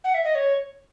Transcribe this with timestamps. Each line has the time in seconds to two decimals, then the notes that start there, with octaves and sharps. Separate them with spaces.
0.04 F#5
0.14 E5
0.25 D#5
0.35 C#5